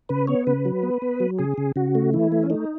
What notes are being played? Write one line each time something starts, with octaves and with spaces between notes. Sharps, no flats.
C#3 B4
B3 C#5
C#3 B4
F#3
B3
B3
F#3
C#3 G#4
C#3
C#3 F#4
A3
E3 E4
A3
C#4
A3 D#4